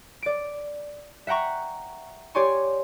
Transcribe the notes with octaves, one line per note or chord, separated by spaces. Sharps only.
D5 D7
E5 F#5 G5 A#5 C#6
G4 C#5 D5 G#5 C6 C#6